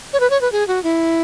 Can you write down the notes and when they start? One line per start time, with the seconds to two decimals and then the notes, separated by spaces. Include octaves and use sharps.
0.13 C#5
0.20 B4
0.30 C#5
0.41 B4
0.52 G#4
0.68 F#4
0.83 E4